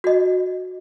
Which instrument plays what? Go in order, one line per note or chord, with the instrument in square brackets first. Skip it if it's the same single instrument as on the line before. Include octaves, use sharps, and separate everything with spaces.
[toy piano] F#4 D#5